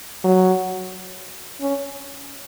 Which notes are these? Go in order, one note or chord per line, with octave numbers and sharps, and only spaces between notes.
F#3
C#4